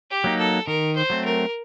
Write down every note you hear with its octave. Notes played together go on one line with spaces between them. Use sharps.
G4
F#3 A#3 D#4
A4
D#3 A#4
C5
F#3 A3 C4
A#4